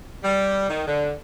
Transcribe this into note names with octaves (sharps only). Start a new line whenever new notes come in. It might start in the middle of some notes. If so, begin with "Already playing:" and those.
G3
D#3
D3